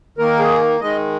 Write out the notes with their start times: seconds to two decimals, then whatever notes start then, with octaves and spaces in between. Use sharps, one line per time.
0.18 D#3 A#3 A#4
0.39 G#4
0.80 D#3 G#3 D#5